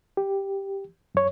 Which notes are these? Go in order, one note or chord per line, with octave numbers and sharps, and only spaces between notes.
G4
F#2 C#5